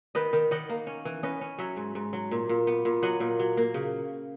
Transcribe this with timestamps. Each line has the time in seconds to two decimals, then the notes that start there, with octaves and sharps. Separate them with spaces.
0.15 D#3 B4 D#5
0.33 D#3
0.51 D#3 D#5 F#5
0.69 A#3
0.87 C#4
1.05 E3
1.23 C#4 B4 D#5
1.41 C#4
1.59 F#3 C#5 E5
1.77 G#2
1.95 G#2
2.13 F#3
2.31 A#2
2.49 A#2
2.67 B3
2.85 A#2
3.03 F#3 D#5 F#5
3.20 A#2
3.39 F#3
3.57 A#3
3.74 C#3